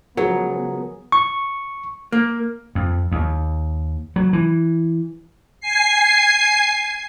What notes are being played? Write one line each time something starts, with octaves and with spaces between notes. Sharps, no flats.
C#3 F3 F#3 B3 G#4 A#4
C#6
A#3
F2
D#2
F#3
E3
G#5 C7